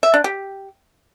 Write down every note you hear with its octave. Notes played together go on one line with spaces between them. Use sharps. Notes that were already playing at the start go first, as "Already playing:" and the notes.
E5
D4
G4